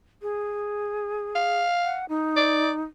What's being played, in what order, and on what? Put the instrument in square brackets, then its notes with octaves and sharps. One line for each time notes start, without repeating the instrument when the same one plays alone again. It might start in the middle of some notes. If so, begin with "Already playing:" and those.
[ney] G#4
[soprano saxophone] F5
[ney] F#5
D#4
[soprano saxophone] D5